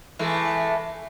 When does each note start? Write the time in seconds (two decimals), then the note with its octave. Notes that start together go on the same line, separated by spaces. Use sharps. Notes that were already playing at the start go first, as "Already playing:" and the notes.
0.19 E3 G#3 A3